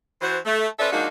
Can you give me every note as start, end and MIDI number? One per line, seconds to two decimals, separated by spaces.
0.21 0.38 52
0.21 0.38 66
0.21 0.38 72
0.45 0.66 57
0.79 0.90 61
0.79 0.90 69
0.79 0.90 71
0.79 0.90 72
0.79 0.90 74
0.79 0.90 76
0.92 1.07 53
0.92 1.07 56
0.92 1.07 58
0.92 1.07 62
0.92 1.07 63
0.92 1.07 66